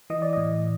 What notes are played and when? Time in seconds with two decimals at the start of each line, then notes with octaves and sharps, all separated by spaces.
0.10 E3 D#5
0.22 D5
0.33 A2 D#5